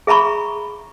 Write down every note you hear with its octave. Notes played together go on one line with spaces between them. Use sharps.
G#4 E5 A#5 B5 C#6